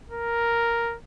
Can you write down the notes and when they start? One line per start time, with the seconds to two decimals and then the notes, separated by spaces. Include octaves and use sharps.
0.10 A#4